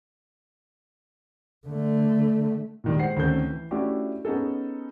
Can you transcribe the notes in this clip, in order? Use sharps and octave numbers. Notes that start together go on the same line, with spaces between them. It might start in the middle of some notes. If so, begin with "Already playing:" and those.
D3 A3
A#2 D#3 G3
G#3 C5 F#5 C7
D2 D#3 C4 C#4 A4 G6
E3
A3 C#4 D4 E4 F#4 G4
B3 C#4 D#4 G#4 A4